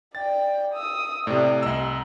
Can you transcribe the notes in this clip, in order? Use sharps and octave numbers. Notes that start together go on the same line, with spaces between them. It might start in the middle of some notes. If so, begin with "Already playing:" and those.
D5 G5 A6
D#6 E6
A2 C3 D5
C2 D#5 A#5 E6